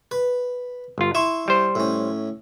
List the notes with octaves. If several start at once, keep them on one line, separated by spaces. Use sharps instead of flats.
B4
G1 F4
E4 E5 C6 C#6
G3 C5
A2 C#4